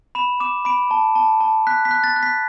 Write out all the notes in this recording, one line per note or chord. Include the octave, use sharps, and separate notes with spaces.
B5 E7
D6 E7
B5 D7
A5
A5
A5
F#6 B6
B6
F#6
A6
F#6
B6